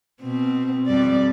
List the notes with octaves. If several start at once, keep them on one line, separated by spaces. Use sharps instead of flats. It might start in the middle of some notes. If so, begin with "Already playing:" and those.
B2 C4
F2 G3 D5